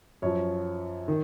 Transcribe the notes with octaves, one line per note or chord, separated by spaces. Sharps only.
F#2 F3 C#5
D#3